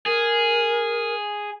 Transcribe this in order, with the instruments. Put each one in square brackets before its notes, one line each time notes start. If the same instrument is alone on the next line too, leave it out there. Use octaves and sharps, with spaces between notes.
[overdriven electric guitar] G#4 [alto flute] A#4